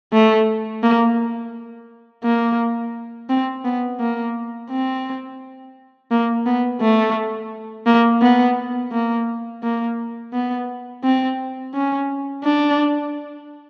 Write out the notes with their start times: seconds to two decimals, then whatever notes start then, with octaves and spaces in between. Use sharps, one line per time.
0.13 A3
0.83 A#3
2.24 A#3
3.30 C4
3.65 B3
4.00 A#3
4.70 C4
6.11 A#3
6.46 B3
6.81 A3
7.86 A#3
8.22 B3
8.92 A#3
9.63 A#3
10.33 B3
11.04 C4
11.74 C#4
12.44 D4